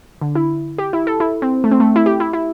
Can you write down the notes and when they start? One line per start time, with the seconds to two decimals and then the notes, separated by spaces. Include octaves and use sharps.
0.21 D3
0.35 E4
0.78 G4
0.93 E4
1.07 A4
1.20 E4
1.42 C4
1.64 A3
1.71 C4
1.80 A3
1.96 E4
2.06 G4
2.20 E4
2.33 E4